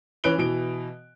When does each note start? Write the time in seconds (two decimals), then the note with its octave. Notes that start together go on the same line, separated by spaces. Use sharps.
0.24 E3 C#4 B4 F#6 D7 G7
0.38 B2 E3 D7